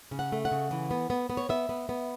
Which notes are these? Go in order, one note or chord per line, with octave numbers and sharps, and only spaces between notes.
C#3
F#5
A3
F#5
C#3
E3
B3
B3
B3
C#5
B3 E5
B3
B3